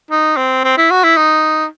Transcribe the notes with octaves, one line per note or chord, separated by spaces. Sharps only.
D#4
C4
C4
E4
F#4
E4
D#4